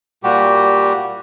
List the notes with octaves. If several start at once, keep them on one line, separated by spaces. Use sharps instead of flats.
A#2 G3 F#4 G4